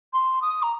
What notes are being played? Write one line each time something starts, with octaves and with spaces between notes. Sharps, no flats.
C6
D#6
A#5